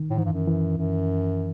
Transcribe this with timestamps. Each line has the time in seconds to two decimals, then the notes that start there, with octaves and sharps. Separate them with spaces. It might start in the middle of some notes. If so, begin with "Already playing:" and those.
Already playing: D#3
0.11 A2
0.18 G#2 E3
0.25 G2
0.33 F#2
0.47 E3
0.78 F#2